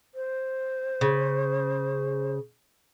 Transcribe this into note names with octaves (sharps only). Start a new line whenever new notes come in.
C5
C#3